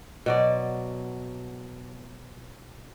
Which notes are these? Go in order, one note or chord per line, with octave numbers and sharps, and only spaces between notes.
B2 F#3 D5